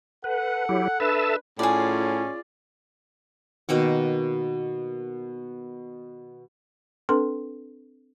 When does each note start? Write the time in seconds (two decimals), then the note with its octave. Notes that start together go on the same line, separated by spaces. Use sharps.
0.24 A4 B4 F#5
0.69 F#3 E4 G4
1.00 D4 A4 B4 E5 A5
1.59 A2 C#4 F4 G#4 D5
3.69 B2 D#3 A#3 F#5
7.09 C4 D4 A4 B4 C6